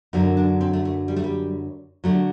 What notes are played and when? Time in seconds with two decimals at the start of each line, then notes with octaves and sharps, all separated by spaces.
0.13 F#2 D3 F#3 D#4
0.37 D4
0.61 C4
0.73 A3
0.85 A3
1.08 G3
1.16 A3
1.24 G3
2.04 D3 F#3 A3